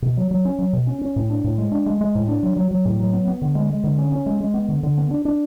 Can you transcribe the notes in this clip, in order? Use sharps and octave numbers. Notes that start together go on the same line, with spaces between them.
B2
F#3
F#3
C#4
F#3
B2
C#4
C#4
A2
D4
A2
G#3
D4
G#3
G#3
A2
D4
F#3
F#3
F#3
A2
F#3
B3
B3
D3
G#3
G#3
D3
C#4
C#4
G#3
G#3
B3
D3
D3
B3
D4
D4